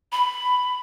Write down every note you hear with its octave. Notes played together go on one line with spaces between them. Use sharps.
B5